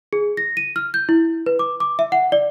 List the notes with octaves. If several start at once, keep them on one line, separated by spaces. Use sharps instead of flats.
G#4
A#6
D#7
F6
G6
E4
B4
D6
D6
E5
F#5
D5